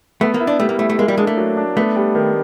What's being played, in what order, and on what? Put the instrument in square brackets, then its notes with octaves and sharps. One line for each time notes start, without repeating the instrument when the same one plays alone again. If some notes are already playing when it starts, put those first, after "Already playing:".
[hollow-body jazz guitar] A3 [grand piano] B3
[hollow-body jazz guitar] A#3
[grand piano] E4
[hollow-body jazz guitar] D4
[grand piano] G3 [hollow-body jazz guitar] A3
[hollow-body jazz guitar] A#3
[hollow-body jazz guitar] A3 [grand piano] E4
[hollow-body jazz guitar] A3
[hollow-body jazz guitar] G#3 [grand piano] A#3
[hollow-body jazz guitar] G3
[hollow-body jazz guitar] G#3 [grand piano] D4
[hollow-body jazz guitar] A3
[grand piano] F#3
D4
[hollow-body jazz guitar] A3 [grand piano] B3
[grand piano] G3
D#3